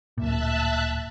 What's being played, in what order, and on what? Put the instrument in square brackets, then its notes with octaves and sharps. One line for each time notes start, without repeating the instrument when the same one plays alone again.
[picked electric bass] D1 A#2 [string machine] E5 A5 F#6